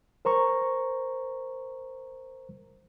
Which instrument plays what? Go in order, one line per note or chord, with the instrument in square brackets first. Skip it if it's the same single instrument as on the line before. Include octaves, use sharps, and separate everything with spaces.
[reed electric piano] A#4 C5 A#5 C#6